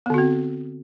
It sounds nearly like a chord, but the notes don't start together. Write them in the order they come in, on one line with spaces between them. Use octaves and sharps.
B3 D3 F#4 C4